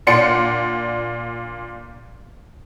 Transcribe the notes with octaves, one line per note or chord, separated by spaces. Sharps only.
A#2 D4 F#5 C6 A6 C#7